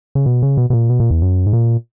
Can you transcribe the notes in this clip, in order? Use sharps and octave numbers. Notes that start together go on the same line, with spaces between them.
C#3
B2
C#3
B2
B2
A#2
B2
A#2
E2
F#2
G#2
A#2